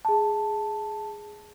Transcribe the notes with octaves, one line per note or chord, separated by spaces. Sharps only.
G#4 A5